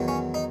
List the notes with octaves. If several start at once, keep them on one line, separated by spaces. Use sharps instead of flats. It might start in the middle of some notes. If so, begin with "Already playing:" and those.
Already playing: E2 D#3 F#3
C#4
D#4